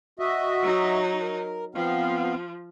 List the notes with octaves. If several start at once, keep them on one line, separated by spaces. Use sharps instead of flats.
F#4 D#5 E5
F#3 D#4
A#4
F3 B3 C4 F5